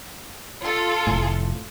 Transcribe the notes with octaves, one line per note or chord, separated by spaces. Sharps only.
F4 A4
F1 A2